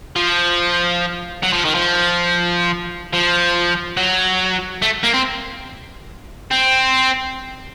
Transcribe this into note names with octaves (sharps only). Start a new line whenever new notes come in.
F3
F#3
F3
D#3
F3
F3
F#3
A3
A#3
C4
C4